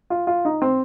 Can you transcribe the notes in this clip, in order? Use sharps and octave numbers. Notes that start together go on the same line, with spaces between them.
F4
F4
D#4
C4